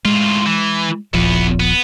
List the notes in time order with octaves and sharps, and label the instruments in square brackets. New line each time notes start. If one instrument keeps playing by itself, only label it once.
[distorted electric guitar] A2 F4 [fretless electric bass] G#3
[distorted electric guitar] E3
[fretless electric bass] D#1 A#1 F3 [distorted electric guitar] E2 B3
[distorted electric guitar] B3